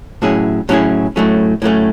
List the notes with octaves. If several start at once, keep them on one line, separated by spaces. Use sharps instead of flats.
A2 F#3 C#4 E4 G#4
A2 F#3 C#4 E4 G#4
A2 F#3 A3 C#4
A2 F#3 A3 C#4